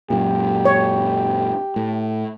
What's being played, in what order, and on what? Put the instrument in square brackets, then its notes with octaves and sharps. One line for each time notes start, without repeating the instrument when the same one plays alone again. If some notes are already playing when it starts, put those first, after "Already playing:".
[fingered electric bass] F#2 A#2 [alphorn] G4
[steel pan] C#5
[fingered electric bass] A2